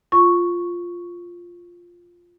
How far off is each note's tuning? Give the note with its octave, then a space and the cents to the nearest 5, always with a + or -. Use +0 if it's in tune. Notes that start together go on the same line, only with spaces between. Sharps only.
F4 +0 C#6 +0